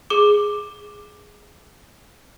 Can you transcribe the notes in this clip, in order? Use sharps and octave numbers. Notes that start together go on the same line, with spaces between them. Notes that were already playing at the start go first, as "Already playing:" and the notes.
G#4 D6